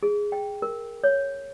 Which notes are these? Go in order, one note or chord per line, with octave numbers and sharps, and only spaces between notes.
G#4
G5
A#4
C#5